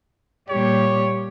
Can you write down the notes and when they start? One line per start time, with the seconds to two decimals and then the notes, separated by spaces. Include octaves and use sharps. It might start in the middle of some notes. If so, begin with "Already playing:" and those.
0.49 A#2 G3 G4 C#5